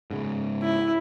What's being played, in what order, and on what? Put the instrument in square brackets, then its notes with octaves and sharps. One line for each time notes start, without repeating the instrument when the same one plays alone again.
[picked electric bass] G#2 C#3
[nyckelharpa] E4